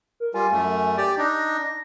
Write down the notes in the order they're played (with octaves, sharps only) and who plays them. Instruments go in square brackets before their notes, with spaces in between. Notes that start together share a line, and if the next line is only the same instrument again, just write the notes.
[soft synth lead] A#4
[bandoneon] G3 F4 [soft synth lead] G#5
[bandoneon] F#2 A3
G4 D5
[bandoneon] D4 D#4 [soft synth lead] A#6